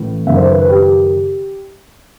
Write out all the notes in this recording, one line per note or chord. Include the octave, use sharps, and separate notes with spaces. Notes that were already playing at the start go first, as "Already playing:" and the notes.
Already playing: A1 A2 E3
F#1 F#2 D#3 E5
C5
B4
B4
G4